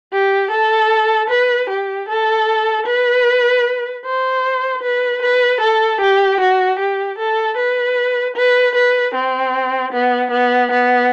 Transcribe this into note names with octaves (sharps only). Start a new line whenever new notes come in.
G4
A4
B4
G4
A4
B4
C5
B4
B4
A4
G4
F#4
G4
A4
B4
B4
B4
C4
B3
B3
B3